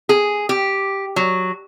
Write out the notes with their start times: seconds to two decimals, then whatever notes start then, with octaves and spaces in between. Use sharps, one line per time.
0.09 G#4
0.49 G4
1.16 F#3